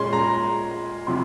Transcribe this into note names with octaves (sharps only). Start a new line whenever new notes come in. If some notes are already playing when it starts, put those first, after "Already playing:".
Already playing: A#2 G#3 C#4 C6
A#5
C3 F3 C6